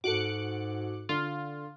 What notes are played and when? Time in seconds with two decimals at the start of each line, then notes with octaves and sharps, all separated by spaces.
0.04 G#2 F#4 A4 D6 F#6 C#7
1.09 D3 F4